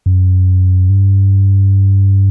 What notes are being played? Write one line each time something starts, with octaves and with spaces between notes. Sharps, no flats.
F#2
G2